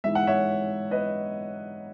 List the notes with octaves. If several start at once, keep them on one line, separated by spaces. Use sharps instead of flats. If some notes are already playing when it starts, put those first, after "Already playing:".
G#2 E3 G#3 E5
F#5
C#5 E5
B4 D#5